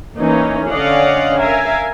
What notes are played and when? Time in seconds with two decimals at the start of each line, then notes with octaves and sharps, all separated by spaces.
0.18 E3 A#3 C#4 D#4
0.69 D3 C#4 D5 D#5 F5 F#5
1.39 A#4 E5 F5 G#5